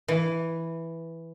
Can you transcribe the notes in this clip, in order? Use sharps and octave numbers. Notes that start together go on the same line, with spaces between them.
E3